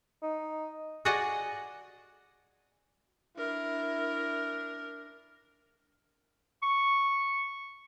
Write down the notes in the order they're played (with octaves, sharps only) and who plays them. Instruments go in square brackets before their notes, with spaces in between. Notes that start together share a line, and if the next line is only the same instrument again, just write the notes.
[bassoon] D#4
[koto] F#4 G#4 D5 D#5 F#5 G#5
[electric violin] D4 A#4 [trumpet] E4
[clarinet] C#6